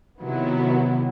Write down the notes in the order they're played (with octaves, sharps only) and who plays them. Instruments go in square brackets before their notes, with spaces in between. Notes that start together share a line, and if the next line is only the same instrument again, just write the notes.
[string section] C3 D#3 F#3 B3 E4